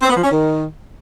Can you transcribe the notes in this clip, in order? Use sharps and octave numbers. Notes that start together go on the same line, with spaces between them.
C4
B3
F3
C#4
D#3